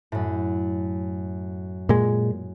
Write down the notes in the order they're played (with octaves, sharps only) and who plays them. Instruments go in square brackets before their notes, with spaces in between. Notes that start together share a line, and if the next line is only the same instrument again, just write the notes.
[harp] F#2 A2
[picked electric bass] A#2 G#3